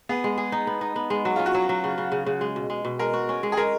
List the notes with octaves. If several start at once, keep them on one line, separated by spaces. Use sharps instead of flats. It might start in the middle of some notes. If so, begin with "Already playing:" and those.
B3 G#4
G#3
G#4
D#4
B3
D#4
B3
G#3
F#3 F#4
C#4 F4
F#4
F#3
F#3
C#3
C#3
C#3
C#3
G#3
B2
G#3
B2
G#3 A#4
F#4
C#4
G#3
G#4
G#3 A#4